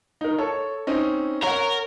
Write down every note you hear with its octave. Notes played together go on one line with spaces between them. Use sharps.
D#4 A#4
A4 C#5
C4 C#4 D#4
A#4 C#5 F#5